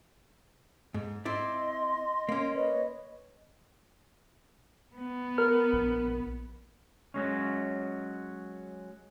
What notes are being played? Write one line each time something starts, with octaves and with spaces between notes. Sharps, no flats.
G#2
C4 E4 D5 D#5 C6
A#3 C#4
B4 C#5 D#5
B3
A#4 F6
A#1
F#3 G#3 C#4